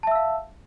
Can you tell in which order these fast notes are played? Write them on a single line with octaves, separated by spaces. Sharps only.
A5 E5 E6 F5